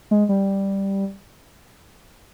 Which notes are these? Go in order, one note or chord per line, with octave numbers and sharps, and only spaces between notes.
G#3
G3